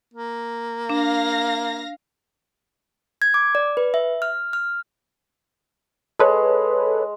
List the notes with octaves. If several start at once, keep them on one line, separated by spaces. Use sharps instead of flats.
A#3
D4 F5 A#6
G#6
D6
D5
B4
E5
F6
F6
G#3 A4 B4 C#5